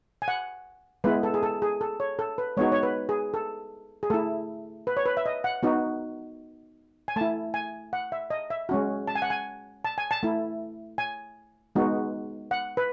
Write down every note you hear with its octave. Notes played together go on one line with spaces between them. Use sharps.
G#5
F#5
G#3 B3 E4 B4
A4
G#4
A4
G#4
A4
C#5
A4
B4
G#3 B3 D#4 F#4 C#5
C#5
B4
G#4
A4
G#4
A3 E4 A4
B4
C#5
B4
E5
D#5
F#5
B3 D#4 F#4
G#5
A3 E4 A5
G#5
F#5
E5
D#5
E5
G#3 C#4 F#4
A5
G#5
F#5
G#5
A5
G#5
A5
A3 E4
G#5
G#3 B3 D#4 F#4
F#5
B4